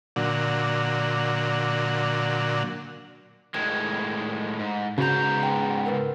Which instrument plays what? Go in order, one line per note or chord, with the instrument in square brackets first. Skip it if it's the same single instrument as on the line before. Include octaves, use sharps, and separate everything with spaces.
[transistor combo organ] A#2 D3 F#3
[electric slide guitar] A2 D#3 G#3 [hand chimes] G#6
[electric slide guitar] G#2
[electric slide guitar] G#2 B3 A#5 [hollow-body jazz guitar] C#3 [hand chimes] F#4 G6
[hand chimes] G5
A#4 B4